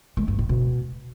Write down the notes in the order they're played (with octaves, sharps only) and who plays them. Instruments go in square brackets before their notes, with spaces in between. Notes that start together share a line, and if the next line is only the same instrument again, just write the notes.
[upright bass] G#3
G2
A2
B2